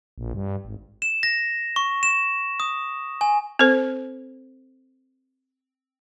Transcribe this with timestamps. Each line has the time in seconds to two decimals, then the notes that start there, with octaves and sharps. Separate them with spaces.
0.18 A#1
0.34 G2
0.65 G#1
1.02 E7
1.23 A#6
1.76 C#6
2.03 E7
2.60 D#6
3.21 G#5
3.59 C4 A4 C5